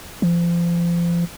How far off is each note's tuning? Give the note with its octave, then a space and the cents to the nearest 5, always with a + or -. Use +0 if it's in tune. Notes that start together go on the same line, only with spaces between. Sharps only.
F3 -30